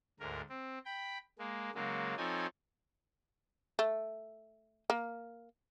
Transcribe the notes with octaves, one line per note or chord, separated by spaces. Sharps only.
D2 G#2 A#4
C4
G5 B5
G#3 A#3
C#3 F#3 G#3 A#3
F3 C4 D#4 A4 C#5 G#5
A3
A#3